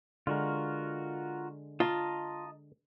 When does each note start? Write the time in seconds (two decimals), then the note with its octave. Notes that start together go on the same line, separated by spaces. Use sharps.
0.27 D3 G#3 F4 F#4 A#4
1.80 F4 D#5 A5 A#5